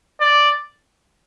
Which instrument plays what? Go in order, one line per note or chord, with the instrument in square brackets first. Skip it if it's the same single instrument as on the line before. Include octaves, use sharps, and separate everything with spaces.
[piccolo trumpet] D5